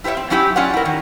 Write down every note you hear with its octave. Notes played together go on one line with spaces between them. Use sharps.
E4 G4 B4 C#5 E5
C4
F#3 C#4 E4 G4
C#4 F4 G4 D5 F#5
E4 A#4
D#3